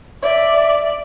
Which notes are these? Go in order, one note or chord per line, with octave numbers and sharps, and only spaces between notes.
D5 E5